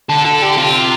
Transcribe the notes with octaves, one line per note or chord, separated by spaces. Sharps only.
D3 A4
A4
G4
C3 F4